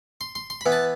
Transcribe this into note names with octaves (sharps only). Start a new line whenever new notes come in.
C6
C6
C6
E3 B3 B5
A5